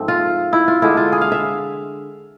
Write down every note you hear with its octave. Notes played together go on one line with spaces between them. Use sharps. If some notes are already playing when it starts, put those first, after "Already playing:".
Already playing: G#2 F3 A3 C4
F4
E4
F4
D3 G#3 D4 E4
F4
G#4
F5
E5